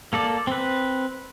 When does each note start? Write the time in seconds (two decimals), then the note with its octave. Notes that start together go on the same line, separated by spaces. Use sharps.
0.13 A#3 A4 D5
0.47 C4 B4